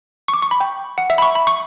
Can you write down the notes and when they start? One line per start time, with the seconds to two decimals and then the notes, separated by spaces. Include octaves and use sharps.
0.28 C#6
0.33 D6
0.42 C#6
0.51 B5
0.60 G5
0.98 F#5
1.10 E5
1.18 B5
1.22 C#6
1.35 B5
1.47 C#6